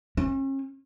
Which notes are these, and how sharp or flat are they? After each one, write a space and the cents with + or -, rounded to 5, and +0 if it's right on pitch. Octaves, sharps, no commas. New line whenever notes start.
C#4 -40